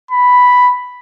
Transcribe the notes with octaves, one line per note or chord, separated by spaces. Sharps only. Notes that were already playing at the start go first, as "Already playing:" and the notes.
B5